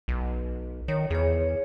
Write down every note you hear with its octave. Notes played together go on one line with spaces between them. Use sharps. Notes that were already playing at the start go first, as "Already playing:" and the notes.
B1
D#3 C#5
E2 G#4 C#5